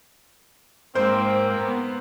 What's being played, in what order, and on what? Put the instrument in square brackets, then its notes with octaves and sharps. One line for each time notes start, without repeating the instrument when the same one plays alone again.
[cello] G#2 [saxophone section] A#3 C4 [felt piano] C5
[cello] B3